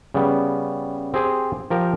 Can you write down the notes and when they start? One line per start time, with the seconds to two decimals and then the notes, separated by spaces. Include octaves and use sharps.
0.14 C#3 G3 B3
1.14 C4 G4 G#4 C5
1.70 F3 G4 A#4